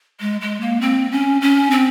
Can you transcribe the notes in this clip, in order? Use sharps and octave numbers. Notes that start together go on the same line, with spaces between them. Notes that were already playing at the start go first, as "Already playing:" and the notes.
G#3
G#3
A#3
C4
C#4
C#4
C4